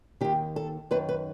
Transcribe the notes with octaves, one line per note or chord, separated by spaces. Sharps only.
D#2 D#3 G4
A4
F#2 D#3 B4
B4